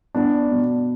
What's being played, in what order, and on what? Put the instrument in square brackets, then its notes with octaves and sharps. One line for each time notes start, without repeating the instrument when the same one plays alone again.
[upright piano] B3 [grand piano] D4
[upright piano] B2